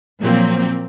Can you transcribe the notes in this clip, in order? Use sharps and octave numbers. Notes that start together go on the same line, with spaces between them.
A#2 F3 F#3 A#3 C4